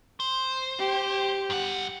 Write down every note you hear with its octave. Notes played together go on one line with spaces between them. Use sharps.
C5
G4
G2 F#5